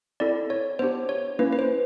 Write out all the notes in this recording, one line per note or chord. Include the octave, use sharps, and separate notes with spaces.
C4 E4 A4 D5
C#5
B3 D4 G4 C5
C#5
A#3 C#4 E4 B4
B4
C5